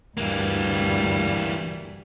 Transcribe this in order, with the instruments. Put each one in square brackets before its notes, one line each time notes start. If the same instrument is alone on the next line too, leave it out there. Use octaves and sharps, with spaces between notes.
[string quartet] D2 G2 G3 [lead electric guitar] E3 A#3